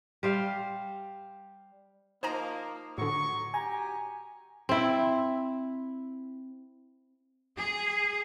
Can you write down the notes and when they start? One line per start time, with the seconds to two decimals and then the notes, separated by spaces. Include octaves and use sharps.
0.23 G3 C5 F5
2.23 F3 A#3 D#4 C5 G#5 A#5
2.98 A2 D3 F#3 C#6
3.54 G4 G#5 A#5
4.69 C4 E4
7.56 G#4